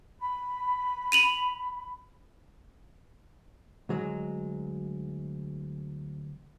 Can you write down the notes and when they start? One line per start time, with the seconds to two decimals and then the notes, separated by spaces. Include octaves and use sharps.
0.21 B5
1.12 D#7 F7 F#7
3.89 D2 F#3 G#3